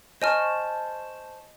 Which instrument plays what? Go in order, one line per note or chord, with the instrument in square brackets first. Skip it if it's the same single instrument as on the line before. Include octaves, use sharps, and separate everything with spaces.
[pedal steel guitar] C5 A5 C#6 [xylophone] D#5 G#5 F6